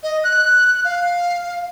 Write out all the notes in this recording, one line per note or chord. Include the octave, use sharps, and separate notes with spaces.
D#5
F#6
F5